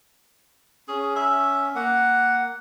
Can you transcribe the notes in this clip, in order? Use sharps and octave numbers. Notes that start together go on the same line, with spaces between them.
C#4 G#4
E5
A#3 F#5